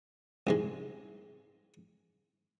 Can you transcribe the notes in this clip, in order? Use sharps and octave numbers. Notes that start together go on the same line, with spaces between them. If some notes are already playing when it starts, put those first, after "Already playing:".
C2 G#2 G#3